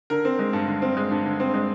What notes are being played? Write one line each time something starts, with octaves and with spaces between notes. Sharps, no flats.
D3 A#4
C4
G#3
G2
D3
C4
G#3
G2
D3
C4
G#3